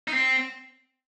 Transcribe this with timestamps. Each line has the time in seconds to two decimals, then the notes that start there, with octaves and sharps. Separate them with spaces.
0.08 D#4
0.13 C4